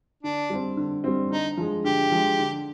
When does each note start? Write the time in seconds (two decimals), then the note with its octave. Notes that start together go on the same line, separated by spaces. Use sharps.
0.23 D3 D4
0.50 G3 C4
0.77 D3
1.04 G3 C4
1.30 D3 D#4
1.57 F3 G#3
1.84 D3 G4
2.12 F3 G#3
2.39 D3